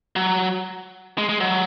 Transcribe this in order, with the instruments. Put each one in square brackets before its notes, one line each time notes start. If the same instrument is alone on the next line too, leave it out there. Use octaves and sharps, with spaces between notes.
[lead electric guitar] F#3
G#3
G#3
F#3